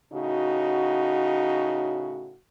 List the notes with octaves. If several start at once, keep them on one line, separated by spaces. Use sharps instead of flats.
A2 C#3 D#4 F#4